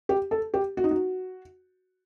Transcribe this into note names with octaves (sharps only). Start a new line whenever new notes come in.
G4
A4
G4
F#4
D#4
F#4